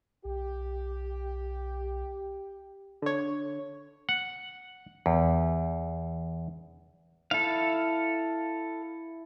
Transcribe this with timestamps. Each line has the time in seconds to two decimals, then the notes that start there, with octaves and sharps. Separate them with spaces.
0.25 B1 G4
3.02 D3 C#5
4.09 F#5
5.06 E2
7.31 E4 A4 F5